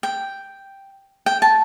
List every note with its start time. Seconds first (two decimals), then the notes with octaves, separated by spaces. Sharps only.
0.03 G5
1.26 G5
1.42 A5